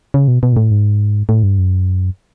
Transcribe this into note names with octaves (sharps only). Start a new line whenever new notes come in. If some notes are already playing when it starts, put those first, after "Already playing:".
C#3
B2
B2
A#2
A2
G#2
A2
G2
F#2